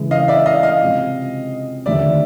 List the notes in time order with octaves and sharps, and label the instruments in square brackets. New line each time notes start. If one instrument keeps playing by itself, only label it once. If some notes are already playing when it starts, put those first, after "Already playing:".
Already playing: [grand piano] C#3 E3 G#3
[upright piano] D#5 F5
D5 E5
D#5 F5
D#5 F5
[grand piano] C3 F3 G#3 C4
[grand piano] D#2 D3 F3 A3 [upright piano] D5 E5